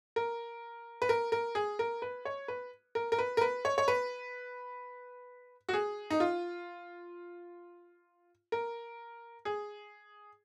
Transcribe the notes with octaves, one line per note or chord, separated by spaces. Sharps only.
A#4
B4
A#4
A#4
G#4
A#4
B4
C#5
B4
A#4
A#4
B4
A#4
B4
C#5
C#5
B4
F#4
G#4
D#4
F4
A#4
G#4